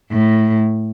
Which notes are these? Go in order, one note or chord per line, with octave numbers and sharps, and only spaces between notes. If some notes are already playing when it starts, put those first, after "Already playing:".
A2